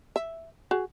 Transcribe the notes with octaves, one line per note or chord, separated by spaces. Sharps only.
E5
F#4 G#4